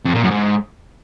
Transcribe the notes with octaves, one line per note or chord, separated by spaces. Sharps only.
F2
A#2
F#2
G#2